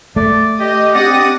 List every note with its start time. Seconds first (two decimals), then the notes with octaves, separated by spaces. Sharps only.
0.16 A3 D5
0.60 G4 D#5
0.95 C4 D4 G4 D5 F#5 D#6 A#6